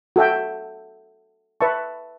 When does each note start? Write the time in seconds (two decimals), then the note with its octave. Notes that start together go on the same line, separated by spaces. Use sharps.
0.16 F#4 A4 E5 G5
1.61 B4 E5 A5 C#6